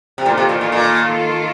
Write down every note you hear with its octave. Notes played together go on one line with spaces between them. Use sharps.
C3
A#2 D#3 A#3 F4 A4
C3
A#2
A#2
A#2